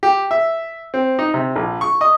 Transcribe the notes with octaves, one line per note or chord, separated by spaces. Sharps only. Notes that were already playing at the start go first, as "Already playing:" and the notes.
G4
E5
C4
D#4
C3
A#1
C#6
D#5